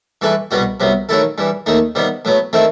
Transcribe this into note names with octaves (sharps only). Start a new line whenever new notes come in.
G2 E3 A3 E4 B4
C2 B2 G3 B3 F#4
C2 C3 F#3 B3
D#3 F#3 A3 E4 A4
G2 E3 G3
D#2 D#3 A3 D#4
C3 D#3 G3 B3
A2 F#3 B3
D#3 A3 C4 E4